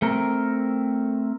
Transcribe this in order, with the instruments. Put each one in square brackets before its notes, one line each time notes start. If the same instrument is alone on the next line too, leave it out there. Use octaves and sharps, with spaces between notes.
[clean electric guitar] A3 C4 A#4